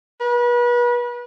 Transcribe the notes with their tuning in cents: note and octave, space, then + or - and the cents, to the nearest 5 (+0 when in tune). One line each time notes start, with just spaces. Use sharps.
B4 -35